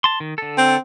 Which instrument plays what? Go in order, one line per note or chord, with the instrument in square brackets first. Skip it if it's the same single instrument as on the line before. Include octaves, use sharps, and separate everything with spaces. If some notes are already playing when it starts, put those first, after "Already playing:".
[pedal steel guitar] A5 C6
D#3
D3 A4
[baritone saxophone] C4